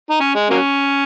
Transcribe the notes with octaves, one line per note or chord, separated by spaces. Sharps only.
D#4
C#4
G#3
F#3 A#3 C#4